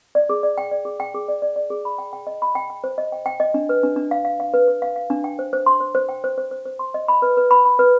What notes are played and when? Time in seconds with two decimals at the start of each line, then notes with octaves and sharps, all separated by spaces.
0.15 D5
0.29 G#4
0.43 D5
0.58 G5
0.71 D5
0.85 G#4
1.00 G5
1.14 G#4
1.28 D5
1.42 D5
1.56 D5
1.70 G#4
1.85 B5
1.98 G5
2.13 G5
2.27 D#5
2.42 B5
2.55 G5
2.70 G5
2.84 C5
2.98 D#5
3.12 G5
3.26 G5
3.40 D#5
3.54 D4
3.69 B4
3.83 D4
3.96 D4
4.11 F5
4.25 F5
4.40 F5
4.54 B4
4.68 B4
4.82 F5
4.96 F5
5.10 D4
5.24 G5
5.39 C5
5.53 C5
5.66 C6
5.80 C5
5.95 C5
6.09 G5
6.24 C5
6.38 C5
6.51 C5
6.66 C5
6.79 C6
6.94 D#5
7.08 B5
7.22 B4
7.37 B4
7.51 B5
7.65 B5
7.79 B4